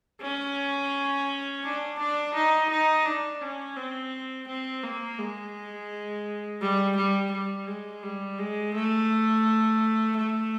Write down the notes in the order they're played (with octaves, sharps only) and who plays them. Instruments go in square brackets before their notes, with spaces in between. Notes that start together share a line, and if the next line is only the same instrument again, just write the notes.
[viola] C#4
D4
D4
D#4
D#4
D4
C#4
C4
C4
A#3
G#3
G3
G3
G3
G#3
G3
G#3
A3
A3